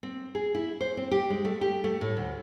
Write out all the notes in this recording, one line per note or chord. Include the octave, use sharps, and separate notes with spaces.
C4
G#4
E4
C5
C4
G4
G#3
A3
G4
A3
A2
D2